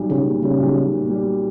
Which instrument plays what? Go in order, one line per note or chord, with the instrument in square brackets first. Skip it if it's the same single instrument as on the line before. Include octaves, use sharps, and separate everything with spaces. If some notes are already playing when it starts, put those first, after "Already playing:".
Already playing: [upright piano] B1 G3
[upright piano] B1 [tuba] C#3
[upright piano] A#2
[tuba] C#3 [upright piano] G3
[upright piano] B1
B1
A#2
G3